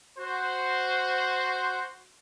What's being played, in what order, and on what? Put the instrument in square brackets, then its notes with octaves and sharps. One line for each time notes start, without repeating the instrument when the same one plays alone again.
[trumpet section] F#4 C5